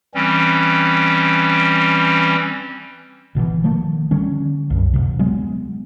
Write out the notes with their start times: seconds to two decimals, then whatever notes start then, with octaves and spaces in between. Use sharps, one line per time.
0.15 E3 G3 C4 C#4
3.35 G1 B2 D3 E3
3.64 D#3 F3 A3 A#3
4.11 D3 G3 C#4
4.70 C2 F#2
4.94 D1 C#2 C3
5.19 F#3 G#3 B3